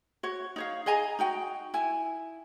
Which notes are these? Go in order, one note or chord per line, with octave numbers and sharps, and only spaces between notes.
F#4 C#5
D#4 C#5 F5
G#4 D#5 G#5 A#5
D#4 F#4 G5
E4 G#5